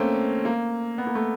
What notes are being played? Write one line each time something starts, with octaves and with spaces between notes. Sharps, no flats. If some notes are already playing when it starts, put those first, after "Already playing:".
Already playing: A3 A#3 C4 C#4
A#3
B3
A#3
A3